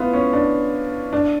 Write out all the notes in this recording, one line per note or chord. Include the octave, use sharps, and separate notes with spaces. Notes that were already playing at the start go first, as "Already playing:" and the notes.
Already playing: B3 E4 F4
C#4
D4
D4